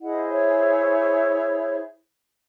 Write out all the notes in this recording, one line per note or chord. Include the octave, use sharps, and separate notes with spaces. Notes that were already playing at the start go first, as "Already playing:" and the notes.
E4 G#4 C5 D#5 F#5
F#5
C#5 E5